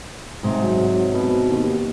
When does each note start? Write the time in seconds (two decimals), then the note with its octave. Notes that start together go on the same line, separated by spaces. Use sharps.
0.43 G#2 C3
0.63 F#3
1.13 B2
1.50 D#2